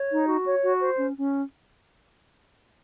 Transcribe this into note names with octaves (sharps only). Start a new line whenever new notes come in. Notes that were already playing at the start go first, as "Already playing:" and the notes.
Already playing: C#5
D#4
F#4
C#5
F#4
C5
C#4
C#4